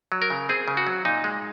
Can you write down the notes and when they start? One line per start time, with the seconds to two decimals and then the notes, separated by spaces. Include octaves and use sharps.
0.12 F#3
0.22 A#4
0.30 C#3
0.49 C4 G#4
0.68 C#3
0.77 F#4
0.87 F#3
1.05 A#2 D#4
1.24 G#3